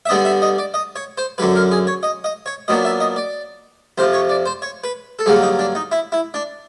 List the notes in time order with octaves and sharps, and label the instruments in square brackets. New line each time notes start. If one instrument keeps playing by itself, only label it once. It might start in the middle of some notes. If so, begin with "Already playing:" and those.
[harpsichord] E5
D3 G3 B3 D4 D#5
E5
D#5
D5
D#5
C#5
C5
F#2 D3 F#3 B4
A#4
G#4
C#5
D#5
D#5
C#5
A#2 F#3 B3 D4 D#5
E5
D#5
D5
F2 C3 F3 C5
C#5
D5
C5
C#5
B4
A4
G2 D3 F#3 A#3 G#4
D#4
D4
D#4
E4
E4
D4